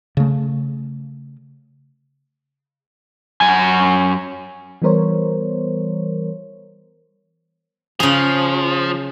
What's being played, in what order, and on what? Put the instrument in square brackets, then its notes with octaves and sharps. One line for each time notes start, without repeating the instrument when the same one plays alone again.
[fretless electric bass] C#3 A3
[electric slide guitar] F#2 G#5
[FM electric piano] E3 G3 B3 A#4 C5 C#5
[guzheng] C#3 G#4 [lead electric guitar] F3